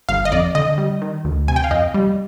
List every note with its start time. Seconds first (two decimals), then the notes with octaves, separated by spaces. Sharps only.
0.09 G1 F5
0.25 D#5
0.32 F2 D5
0.55 D3 D#5
0.78 G3
1.02 D#3
1.25 D2
1.48 C3 G#5
1.56 G5
1.64 F5
1.71 F2 D#5
1.94 G3